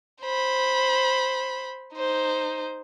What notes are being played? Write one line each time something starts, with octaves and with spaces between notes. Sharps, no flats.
C5 B5
D#4 C5